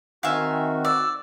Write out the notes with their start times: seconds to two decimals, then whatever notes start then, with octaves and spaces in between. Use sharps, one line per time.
0.23 D#3 C4 F#4 E5 F5 G#5
0.85 D5 E6